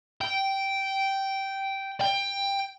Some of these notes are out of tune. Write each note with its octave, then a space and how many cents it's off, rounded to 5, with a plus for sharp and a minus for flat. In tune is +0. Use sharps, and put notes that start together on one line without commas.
G5 -10
G5 +15